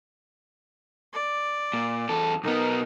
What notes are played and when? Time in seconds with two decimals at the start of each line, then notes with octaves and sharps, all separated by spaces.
1.13 D5
1.74 A#2
2.09 E2 A4
2.43 B1 B3 D#4 A#4